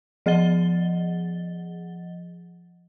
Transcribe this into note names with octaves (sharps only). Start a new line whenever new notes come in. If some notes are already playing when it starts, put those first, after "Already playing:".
F3 G#4 D#5 F#5 A6 G7